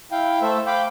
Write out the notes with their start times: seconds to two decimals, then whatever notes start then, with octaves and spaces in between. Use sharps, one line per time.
0.11 E4 F5 G5
0.42 A3 A4 C5 E5
0.67 F5 G5 B5 D6 G6